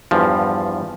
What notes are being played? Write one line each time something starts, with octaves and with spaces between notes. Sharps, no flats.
E2 G2 F3